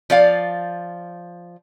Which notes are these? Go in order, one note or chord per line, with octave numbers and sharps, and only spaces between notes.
F3 D5 F5